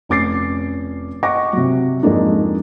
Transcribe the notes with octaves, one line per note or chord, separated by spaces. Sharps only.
F1 C#4 D6 A6 C7
D#5 F#5 C#6 D6 A#6
C3 F#3
F2 G#2 G#3 A#3 D4 D#4